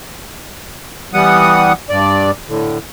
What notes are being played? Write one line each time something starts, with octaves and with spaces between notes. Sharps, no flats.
E3 G3 B3 F#5 D#6
G2 D5
A2 D3